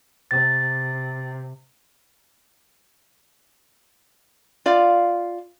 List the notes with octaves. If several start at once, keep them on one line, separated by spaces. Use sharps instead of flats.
C3 A6
F4 D5 F5